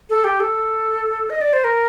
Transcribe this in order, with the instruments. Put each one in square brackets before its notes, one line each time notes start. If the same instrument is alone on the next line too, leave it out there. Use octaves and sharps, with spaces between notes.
[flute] A4
G4
A4
D#5
D5
C5
A#4